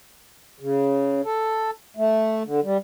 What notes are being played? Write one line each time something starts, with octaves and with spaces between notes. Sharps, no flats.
C#3
A4
A3
D3
G3